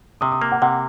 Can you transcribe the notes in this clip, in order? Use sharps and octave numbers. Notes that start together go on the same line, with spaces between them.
C3 D#6
D#6
A#3
F#5
C3 F#5